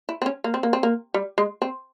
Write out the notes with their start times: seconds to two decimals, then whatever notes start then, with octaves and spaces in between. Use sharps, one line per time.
0.09 E4
0.22 C4
0.26 C#4
0.44 A#3
0.54 C4
0.63 A#3
0.73 C4
0.83 A#3
1.14 G3
1.38 G#3
1.62 C4